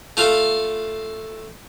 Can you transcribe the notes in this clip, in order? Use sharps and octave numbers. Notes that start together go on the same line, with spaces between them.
A3 F4 F5